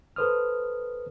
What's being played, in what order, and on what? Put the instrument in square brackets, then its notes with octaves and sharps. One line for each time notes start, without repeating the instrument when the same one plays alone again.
[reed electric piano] A4 B4 C5 D#6 F6